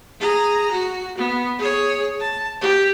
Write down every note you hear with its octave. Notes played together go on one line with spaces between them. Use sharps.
G#4 A#5
F#4
B3
G#4 C#5
A5
G4